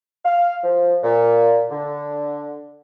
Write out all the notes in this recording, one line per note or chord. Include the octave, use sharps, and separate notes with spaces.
F5
F3
A#2
D3